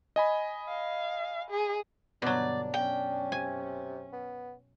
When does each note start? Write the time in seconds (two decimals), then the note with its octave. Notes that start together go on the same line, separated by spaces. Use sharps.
0.16 D#5 G#5 B5
0.68 F5
1.50 G#4
2.22 G1 B2 F#3 D4 D5
2.74 F#2 C#4 G5
3.32 C3 G#5
4.13 B3